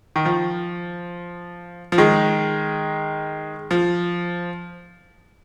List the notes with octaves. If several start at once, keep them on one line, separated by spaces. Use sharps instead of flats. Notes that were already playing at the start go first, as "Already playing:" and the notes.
D#3
F3
F3
D#3 G#3
F3